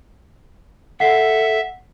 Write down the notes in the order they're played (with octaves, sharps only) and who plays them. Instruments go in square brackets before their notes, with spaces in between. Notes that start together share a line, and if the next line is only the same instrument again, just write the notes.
[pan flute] A4 [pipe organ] E5 [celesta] F#5 C7